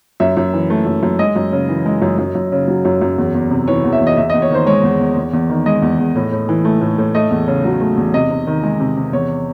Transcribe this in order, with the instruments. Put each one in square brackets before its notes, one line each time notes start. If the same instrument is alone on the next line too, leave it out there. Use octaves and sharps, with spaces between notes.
[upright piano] F#2 E5
F#2
E3
A3
F#2
F#2
G#3 D#5
F#2
C#3
E3
G#3
F#2
F#2
F#2
C#3
F#3
F#2
F#2
E2
E2
C3
E3 C#5
E2
E5
E2
D#5
E2 E5
E2 D#5
C#5
D#3 C5
G#3 C#5
E2
E2
E2
E2
D#3
G#3 D#5
E2
E2
A2
A2
E3
A3
A2
A2
A3 D#5
E2
C#3
F#3
A3
E2
C3 D#5
C3
D#3
G#3
C3
C3
E2 C#5